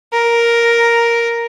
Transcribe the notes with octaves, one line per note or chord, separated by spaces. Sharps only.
A#4